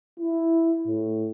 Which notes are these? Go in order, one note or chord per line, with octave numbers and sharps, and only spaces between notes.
E4
A2